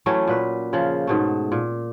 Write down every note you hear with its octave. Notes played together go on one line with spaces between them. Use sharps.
E3 F#3 A3 C#4
A#2 B4
C#3 F3
G#2 B2 A3
A#2